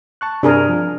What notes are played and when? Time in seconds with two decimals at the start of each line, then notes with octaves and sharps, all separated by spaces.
0.21 A5 C#6 F#6
0.43 G2 C3 D4 G#4 A#4
0.69 F3